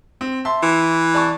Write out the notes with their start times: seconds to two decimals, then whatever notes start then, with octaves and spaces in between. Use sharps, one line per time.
0.21 C4
0.45 E5 A5 C6
0.63 E3
1.14 D5 A5 C#6